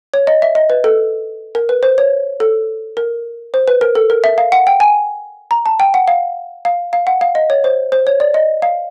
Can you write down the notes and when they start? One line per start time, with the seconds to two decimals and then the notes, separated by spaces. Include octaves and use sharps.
0.14 C#5
0.27 D#5
0.42 E5
0.55 D#5
0.70 B4
0.84 A4
1.55 A#4
1.69 B4
1.83 C5
1.98 C#5
2.40 A4
2.97 A#4
3.54 C5
3.68 B4
3.81 A#4
3.95 A4
4.10 A#4
4.24 E5
4.38 F5
4.52 F#5
4.67 G5
4.80 G#5
5.51 A#5
5.66 A5
5.80 G5
5.94 F#5
6.08 F5
6.65 F5
6.93 F5
7.07 F#5
7.21 F5
7.35 D#5
7.50 C#5
7.64 C5
7.92 C5
8.07 C#5
8.20 D5
8.34 D#5
8.62 F5